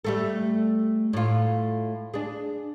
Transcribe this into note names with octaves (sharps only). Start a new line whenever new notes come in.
G3 A3 A4
A2 F4
D4 G#4